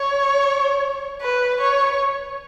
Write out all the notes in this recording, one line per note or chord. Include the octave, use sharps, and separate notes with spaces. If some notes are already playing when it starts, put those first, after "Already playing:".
Already playing: C#5
B4
C#5